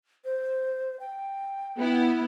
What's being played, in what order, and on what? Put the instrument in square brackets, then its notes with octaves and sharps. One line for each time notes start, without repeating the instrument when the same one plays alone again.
[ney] C5
G5
[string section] B3 E4